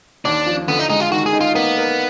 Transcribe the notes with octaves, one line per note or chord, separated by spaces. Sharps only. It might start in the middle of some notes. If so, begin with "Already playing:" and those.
D#2 D4
F3
D3 B3
D#4
G#3 D#4
F4
D#3 F#4
G#4
D#4
F4
A#3 B3
A#4